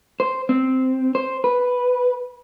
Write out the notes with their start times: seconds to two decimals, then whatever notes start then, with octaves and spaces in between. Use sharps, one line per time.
0.20 C5
0.49 C4
1.15 C5
1.44 B4